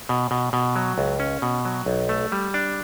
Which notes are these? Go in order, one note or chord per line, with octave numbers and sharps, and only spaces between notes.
B2
B2
B2
F#3
C#2
C#4
B2
F#3
B1
A3
G3
D4